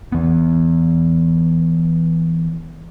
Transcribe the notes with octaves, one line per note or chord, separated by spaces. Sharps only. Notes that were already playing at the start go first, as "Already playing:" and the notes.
E3 B3